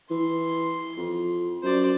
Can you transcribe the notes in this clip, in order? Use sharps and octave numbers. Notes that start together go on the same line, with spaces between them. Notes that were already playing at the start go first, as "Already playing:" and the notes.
E3 C6
F2
F#2 C5 D5